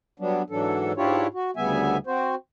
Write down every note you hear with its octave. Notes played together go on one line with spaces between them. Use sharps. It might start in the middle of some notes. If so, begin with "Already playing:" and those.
F#3 G3 B3 D4
G#2 E3 F#3 D4 A4
G#2 D4 E4 F4 G4 C#5
F#4
D2 C#3 G3 B3 E5 G#5
C4 F#4 C5